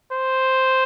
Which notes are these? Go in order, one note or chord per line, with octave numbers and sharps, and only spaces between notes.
C5